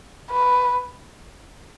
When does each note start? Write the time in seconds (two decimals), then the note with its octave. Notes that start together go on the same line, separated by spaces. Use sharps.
0.31 B4